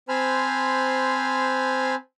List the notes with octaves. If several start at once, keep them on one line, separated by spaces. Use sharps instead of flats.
C4 C5 G#5 A5 B5 F6